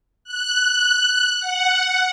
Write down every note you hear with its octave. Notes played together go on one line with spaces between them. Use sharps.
F#6
F#5